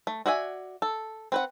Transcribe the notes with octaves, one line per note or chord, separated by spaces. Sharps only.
A3
F#4 D5 E5 G#5
A4
C4 B4 F#5